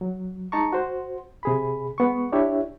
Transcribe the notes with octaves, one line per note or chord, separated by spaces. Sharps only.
F#3
G#3 D#4 A5 A#5 C#6
F#4 C5
C3 G#4 B5
G#3 B3 C#6
D4 E4 G4 C#5 E5